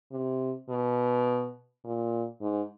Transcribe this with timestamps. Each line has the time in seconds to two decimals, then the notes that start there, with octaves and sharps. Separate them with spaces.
0.12 C3
0.69 B2
1.84 A#2
2.41 G#2